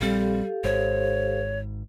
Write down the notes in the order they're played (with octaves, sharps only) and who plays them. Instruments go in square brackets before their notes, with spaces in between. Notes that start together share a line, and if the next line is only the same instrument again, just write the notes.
[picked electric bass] A#1 C4 [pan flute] G3 [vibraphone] G4 A4 F5
[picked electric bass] G#1 G#2 [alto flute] C5 [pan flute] C#5